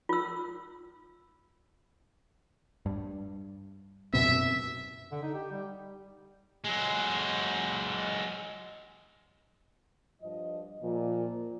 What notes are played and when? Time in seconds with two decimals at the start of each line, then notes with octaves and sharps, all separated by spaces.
0.09 F4 E6
2.86 G2
4.14 F#2 B2 C4 E5
5.11 D3
5.22 D#4
5.34 G4
5.51 G3
6.64 F#3 G#3
10.22 G2 F3 D#5
10.81 A#2 F3